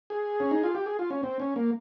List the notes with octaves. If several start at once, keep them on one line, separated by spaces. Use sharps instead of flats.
G#4
C#4
D#4
F4
G4
G#4
F4
C#4
C4
C#4
A#3